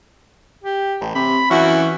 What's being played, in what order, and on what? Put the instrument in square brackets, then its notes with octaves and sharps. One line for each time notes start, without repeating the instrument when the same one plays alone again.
[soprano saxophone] G4
[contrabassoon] A1
[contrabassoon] C3 [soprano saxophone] B5
[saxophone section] F#2 C#4 F#4 [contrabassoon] E3 [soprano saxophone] E4